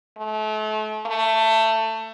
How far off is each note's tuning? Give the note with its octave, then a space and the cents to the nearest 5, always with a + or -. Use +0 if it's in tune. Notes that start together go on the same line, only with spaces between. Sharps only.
A3 -35
A3 +20